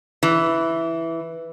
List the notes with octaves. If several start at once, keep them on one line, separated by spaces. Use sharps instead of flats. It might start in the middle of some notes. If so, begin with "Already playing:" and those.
E3